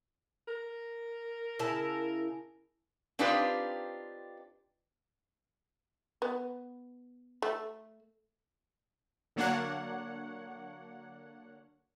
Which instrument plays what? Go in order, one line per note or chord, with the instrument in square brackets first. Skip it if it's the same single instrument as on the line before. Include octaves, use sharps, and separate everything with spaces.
[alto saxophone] A#4
[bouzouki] C#3 E4 A5
[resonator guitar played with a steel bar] C4 D4 D#4 F4 G4 B4
[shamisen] B3
A3
[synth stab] D3 F#3 A#3 D4 C#5 F#5